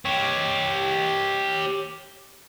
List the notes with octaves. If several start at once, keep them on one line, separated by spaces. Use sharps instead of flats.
G4 C#5